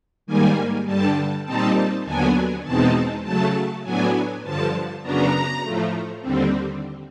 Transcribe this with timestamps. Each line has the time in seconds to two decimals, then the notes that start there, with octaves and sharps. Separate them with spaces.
0.27 G#2 D#3 G3 A#3 G#5
0.86 G2 D3 G3 A5
1.46 A#2 G3 C4 D#4 A5
2.05 D#2 D3 F#3 B3 D4 G#5
2.64 E2 B2 G#3 C4 D#4 A5
3.24 C#3 F#3 A3 A5
3.84 A2 F#3 B3 D4 G#5
4.43 G2 D3 F3 A5
5.03 F#2 C#3 F#3 B3 D4 A#5
5.62 A2 F3 A3
6.21 D#2 D3 G3 C4